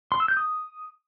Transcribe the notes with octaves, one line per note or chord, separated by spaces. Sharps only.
C6
E6
G6
D#6